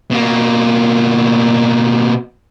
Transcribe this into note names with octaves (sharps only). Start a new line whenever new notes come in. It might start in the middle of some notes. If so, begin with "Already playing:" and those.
B2 A#3